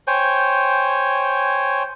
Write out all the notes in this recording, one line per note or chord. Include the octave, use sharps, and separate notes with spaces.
C5 C#5 G5 G#5